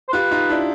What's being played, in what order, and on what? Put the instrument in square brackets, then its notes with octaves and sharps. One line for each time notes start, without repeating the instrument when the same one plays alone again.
[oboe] C5
[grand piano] F4 G4 [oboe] B4
[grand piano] D#4 F4
D4 E4